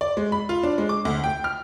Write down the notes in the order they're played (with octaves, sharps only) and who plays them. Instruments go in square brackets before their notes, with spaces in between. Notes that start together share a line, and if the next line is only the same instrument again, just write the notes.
[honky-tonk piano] D5
G#3
B5
F4
D4
G#3
D6
D2
G5
F6